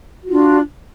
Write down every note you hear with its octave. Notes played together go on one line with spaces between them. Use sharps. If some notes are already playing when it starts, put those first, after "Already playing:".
D4 F4 F#4